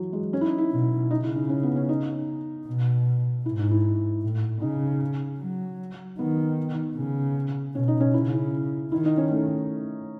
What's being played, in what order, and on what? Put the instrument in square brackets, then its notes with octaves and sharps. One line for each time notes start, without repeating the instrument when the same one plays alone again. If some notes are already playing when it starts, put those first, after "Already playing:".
Already playing: [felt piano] E3 F#3
G#3
C#4
E4
D#4
E4
[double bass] B2
[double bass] C#3 [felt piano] D#4
[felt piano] E4
D#4
C#4
B3
C#4
D#4
[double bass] B2
[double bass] G#2 [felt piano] E4
[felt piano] D#4
E4
[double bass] A2
[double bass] C#3 [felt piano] D#4
[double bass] F#3
[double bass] D#3 [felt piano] B3
[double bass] C#3
[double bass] B2 [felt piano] C#4
[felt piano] D#4
C#4
[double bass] C#3 [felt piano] E4
[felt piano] E4
[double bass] D#3 [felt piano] E4
[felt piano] D#4
C#4
A3